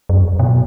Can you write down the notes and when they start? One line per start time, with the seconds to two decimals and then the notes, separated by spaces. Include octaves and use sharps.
0.09 F#2
0.39 B2